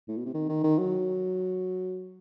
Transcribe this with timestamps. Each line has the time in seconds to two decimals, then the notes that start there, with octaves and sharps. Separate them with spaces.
0.08 A2
0.17 B2
0.26 C3
0.34 D#3
0.49 D#3
0.63 D#3
0.78 F#3